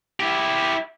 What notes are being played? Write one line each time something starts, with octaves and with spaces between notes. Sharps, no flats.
E4 G4